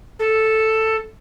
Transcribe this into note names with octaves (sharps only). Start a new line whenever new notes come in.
A4